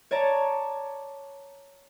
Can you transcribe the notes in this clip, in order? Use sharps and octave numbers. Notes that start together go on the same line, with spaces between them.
C#5 D5 A5 A#5